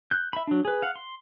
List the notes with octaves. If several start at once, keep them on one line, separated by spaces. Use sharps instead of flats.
F#6 G6
E5 B5
F#3 D4
G#4 B4
F5 F#5
C6